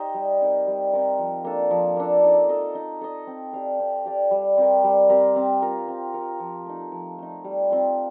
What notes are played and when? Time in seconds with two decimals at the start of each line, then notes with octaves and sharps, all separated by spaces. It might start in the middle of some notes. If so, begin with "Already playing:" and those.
Already playing: D#4 G4 C5 D#5
0.14 G3
0.41 C4 D#4 A#4
0.67 G3
0.93 C4 D#4 A#4
1.19 F3
1.45 A#3 D4 A4
1.71 F3
1.97 A#3 D4 A4
2.23 D#4
2.49 A4 D#5
2.75 D#4
3.01 A4 D#5
3.27 C4
3.53 G4 D5 F5
3.80 C4
4.05 G4 D5 F5
4.31 G3
4.57 C4 G4 A#4
4.84 G3
5.09 C4 G4 A#4
5.36 C4
5.62 F4 A#4
5.88 C4
6.14 F4 A#4
6.40 F3
6.66 A3 D#4
6.92 F3
7.18 A3 D#4
7.44 G3
7.70 C4 F4